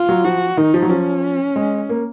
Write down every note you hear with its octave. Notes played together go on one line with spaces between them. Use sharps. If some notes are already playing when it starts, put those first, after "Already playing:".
Already playing: F4
F#3
F3 F#4
D#3 D#4
F3
F#3
F3 C#4
G#3
A#3